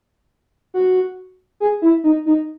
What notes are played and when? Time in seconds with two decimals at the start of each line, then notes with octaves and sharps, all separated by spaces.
0.74 F#4
1.60 G#4
1.82 E4
2.04 D#4
2.26 D#4